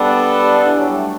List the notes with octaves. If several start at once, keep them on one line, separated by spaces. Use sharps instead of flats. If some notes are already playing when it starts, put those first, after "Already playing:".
Already playing: G3 B3 D4 A4
G3
D3
E3
F#3
G3
A3